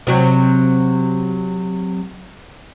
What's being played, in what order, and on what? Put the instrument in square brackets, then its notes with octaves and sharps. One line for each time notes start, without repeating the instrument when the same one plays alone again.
[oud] C3 F#3